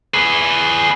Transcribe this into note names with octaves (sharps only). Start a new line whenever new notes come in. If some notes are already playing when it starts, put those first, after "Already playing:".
G#4 B4